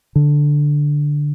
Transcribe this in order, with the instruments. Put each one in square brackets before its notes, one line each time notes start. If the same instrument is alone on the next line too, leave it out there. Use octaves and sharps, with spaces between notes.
[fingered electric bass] D3